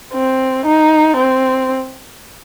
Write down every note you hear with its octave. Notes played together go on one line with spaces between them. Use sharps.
C4
D#4
C4